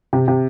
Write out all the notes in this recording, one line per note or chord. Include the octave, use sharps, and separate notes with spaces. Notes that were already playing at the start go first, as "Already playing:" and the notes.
C3
C3